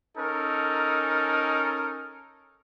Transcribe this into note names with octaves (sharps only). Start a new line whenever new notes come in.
C#4 D#4 A4 A#4